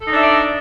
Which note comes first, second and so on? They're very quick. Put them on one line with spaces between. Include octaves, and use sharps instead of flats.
A4 D#4 D4 E5 D5